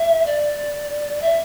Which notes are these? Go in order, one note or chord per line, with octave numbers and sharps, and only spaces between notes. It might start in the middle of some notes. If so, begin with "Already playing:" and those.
Already playing: E5
D5
E5